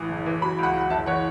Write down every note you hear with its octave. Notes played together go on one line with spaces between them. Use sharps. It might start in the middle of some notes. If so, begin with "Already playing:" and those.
Already playing: A1 E3
F#1
E3
F#3 B5
C#2 F#5 B5
C#2
F#5
F#1 E5 A5
E3 C#5 F#5